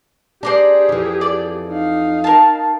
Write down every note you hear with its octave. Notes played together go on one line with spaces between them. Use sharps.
D4 G4 G#4 C5 D5 A#5
F2 E3
D5
D#4 F5
A#4 A5